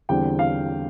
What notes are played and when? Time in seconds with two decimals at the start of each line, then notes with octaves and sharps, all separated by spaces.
0.09 E2 D3 G3 C4 G5
0.39 F5